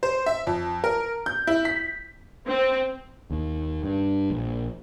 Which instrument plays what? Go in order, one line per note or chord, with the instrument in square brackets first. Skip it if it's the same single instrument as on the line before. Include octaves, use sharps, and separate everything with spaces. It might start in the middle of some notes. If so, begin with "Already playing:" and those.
[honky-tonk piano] C5
E5
F2
A#4
G6
E4
B6
[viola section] C4
[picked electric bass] D#2
G2
A#1